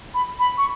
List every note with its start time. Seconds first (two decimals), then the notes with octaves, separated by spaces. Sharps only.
0.14 B5
0.39 B5
0.58 C#6